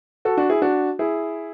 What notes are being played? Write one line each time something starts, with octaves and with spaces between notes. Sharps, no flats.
F#4 A4
D4 F#4
E4 G#4
D4 F#4
E4 G#4